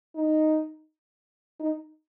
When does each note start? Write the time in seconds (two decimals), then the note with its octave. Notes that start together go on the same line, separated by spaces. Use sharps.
0.15 D#4
1.60 D#4